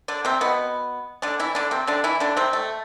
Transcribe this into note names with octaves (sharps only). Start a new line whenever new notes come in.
D3 D4
C3 C4
B2 B3
D3 D4
E3 E4
D3 D4
C3 C4
D3 D4
E3 E4
D3 D4
C3 C4
A3